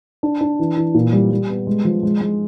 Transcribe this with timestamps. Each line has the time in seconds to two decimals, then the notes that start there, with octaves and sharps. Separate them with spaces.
0.23 D4
0.41 D4
0.59 E3
0.77 E3
0.94 A#2
1.13 G3
1.31 G3
1.49 B3
1.67 G#3
1.85 F3
2.03 G#3
2.21 G#3